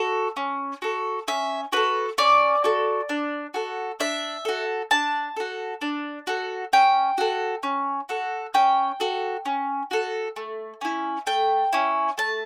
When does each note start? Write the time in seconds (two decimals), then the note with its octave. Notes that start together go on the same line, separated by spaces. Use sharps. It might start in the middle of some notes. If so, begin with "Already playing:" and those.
Already playing: F#4 A4
0.36 C#4
0.82 F#4 A4
1.28 C#4 E5
1.72 F#4 A4 B4
2.18 C#4 D5
2.64 F#4 A4
3.09 D4
3.54 F#4 A4
4.00 D4 E5
4.45 F#4 A4
4.91 D4 A5
5.37 F#4 A4
5.81 D4
6.27 F#4 A4
6.73 C#4 G5
7.18 F#4 A4
7.63 C#4
8.09 F#4 A4
8.54 C#4 G5
9.00 F#4 A4
9.45 C#4
9.91 F#4 A4
10.36 A3
10.81 C#4 E4
11.27 A3 G5
11.73 C#4 E4
12.18 A3 A5